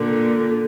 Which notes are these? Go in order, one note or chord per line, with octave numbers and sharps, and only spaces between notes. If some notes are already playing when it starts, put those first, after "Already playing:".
Already playing: A#2 D3